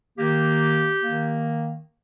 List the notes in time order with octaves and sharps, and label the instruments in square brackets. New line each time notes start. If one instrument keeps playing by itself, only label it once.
[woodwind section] D#3 A#3 G4
D#3 A#3